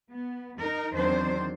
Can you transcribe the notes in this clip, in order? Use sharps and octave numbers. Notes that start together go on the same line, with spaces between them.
B3
D#4 A#4
E2 D#3 F#3 C4 D4 C5